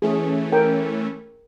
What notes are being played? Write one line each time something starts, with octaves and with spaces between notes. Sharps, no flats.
E3 A3 C#4 G#4
A#4 G5